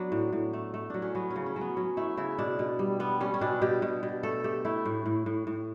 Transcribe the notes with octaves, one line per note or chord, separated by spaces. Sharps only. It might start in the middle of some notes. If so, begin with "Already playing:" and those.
Already playing: F#3 B3 D4
A2
A2
A3
A3
F#3 D4
C#4
F#3 B3
C#4
C#3
C#4
F#3
B3
F#3 C#4
A3 E4
C#3 E4
B2 D4
B2
G3
G3 B3
G3 C#4
C#4
B2 D4
B2 G4
B2
B2
A3 A4
A3 G4
A3 E4
A2
A2
A2
A2